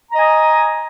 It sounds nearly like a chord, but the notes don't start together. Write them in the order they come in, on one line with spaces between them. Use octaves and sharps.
A#5 D#5 G#5